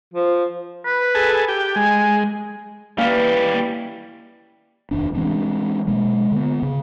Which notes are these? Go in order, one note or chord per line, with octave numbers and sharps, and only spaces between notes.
F3
B4
G#4 A4
G4
G#3 G#5
E3 G3 A#3 C#4 F5
F1 D#2 C#4 D4
E3 G#3 C4 D4
B2 G#3 A#3
D3 B3
C#3